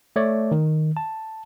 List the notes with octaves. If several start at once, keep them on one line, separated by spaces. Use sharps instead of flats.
A3 C#5 D5
D#3
A5